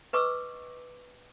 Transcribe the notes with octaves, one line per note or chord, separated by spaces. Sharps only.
B4 D#5 C#6 D6 E6